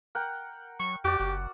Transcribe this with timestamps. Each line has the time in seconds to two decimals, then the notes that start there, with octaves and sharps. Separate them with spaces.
0.15 A#4 F#5 G5
0.80 F#3 C#6
1.04 F2 F#4 G4 D5
1.20 F#1